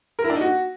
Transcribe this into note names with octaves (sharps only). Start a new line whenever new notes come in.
A#4
E4
D4
D#4
F#4